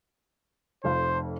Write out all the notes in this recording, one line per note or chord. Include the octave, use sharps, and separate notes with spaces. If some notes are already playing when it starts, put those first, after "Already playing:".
F1 F2 C5 F5